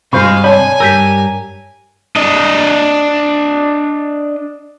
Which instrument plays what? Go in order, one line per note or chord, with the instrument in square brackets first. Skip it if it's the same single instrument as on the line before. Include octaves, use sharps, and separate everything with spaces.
[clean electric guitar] G2 C3 [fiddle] G#3 F5 [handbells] F#4 C5 C#6 [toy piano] B5
[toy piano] C#5 D5 A5 [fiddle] G#5 [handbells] B5
[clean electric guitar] G2 G4 A#4 [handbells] E6 G6 B6
[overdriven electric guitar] D4 D#5